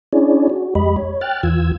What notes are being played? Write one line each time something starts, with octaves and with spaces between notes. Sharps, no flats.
C#4 D4 E4 G#4 C#5 D5
F#4
F2 G#3 G4 D#5 B5
C#5
G5 F6 F#6 A6
E2 E3 F4 E6 G#6